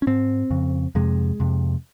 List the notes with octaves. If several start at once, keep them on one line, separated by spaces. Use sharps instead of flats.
C#4
G#2 C4
F2 C#3
F2 C3 G#3
F2 C3